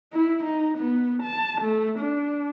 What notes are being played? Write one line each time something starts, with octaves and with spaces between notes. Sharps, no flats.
E4
D#4
B3
A5
A3
D4